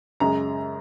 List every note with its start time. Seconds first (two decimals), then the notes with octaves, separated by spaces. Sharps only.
0.20 F#2 C#3 G#3 A#5